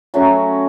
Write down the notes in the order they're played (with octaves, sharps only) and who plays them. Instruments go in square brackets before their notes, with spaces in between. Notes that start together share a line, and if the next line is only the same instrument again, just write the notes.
[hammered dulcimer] F#3 A3 C#4 F#4